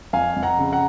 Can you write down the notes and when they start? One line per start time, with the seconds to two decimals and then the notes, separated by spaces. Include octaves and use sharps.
0.13 F2 F5 G#5
0.36 F2
0.43 F#5 A#5
0.59 C#3
0.72 F#5 A#5